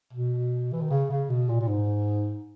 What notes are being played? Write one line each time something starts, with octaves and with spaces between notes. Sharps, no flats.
B2
E3
D#3
C#3
C#3
B2
A#2
A#2
G#2